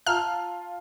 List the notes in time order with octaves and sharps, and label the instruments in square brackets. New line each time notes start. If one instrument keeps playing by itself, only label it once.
[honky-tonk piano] F4 [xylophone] A5 A#5 E6 [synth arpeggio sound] F6